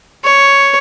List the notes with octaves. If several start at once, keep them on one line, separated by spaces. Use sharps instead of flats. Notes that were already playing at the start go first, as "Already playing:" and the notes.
C#5